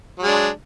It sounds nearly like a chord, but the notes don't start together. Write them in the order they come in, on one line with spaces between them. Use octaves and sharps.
F#3 G#3 D4